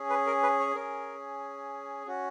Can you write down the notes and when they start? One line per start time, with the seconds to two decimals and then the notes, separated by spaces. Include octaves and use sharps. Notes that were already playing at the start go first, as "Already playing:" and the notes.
Already playing: C#4 G#4
0.10 B4
0.27 A#4
0.43 B4
0.60 C#5
0.75 C#4 G#4 A#4
2.07 C#4 F#4